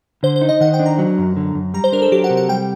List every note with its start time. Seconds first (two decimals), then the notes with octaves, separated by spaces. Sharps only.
0.23 D3 C5
0.36 C5
0.42 D#4
0.49 D#5
0.61 D#3 F#5
0.74 G5
0.79 D4
0.86 A#5
0.98 F#3
1.18 F#2
1.37 D3
1.55 F#2
1.74 G3 A#5
1.84 C5
1.92 D4 A#4
2.02 A4
2.12 F#3 G4
2.24 F#5
2.30 C3
2.37 F#5
2.49 G3 G5